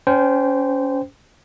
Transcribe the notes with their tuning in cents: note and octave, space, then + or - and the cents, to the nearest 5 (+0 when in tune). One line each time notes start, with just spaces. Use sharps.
C#4 +20 C5 -20 G5 +0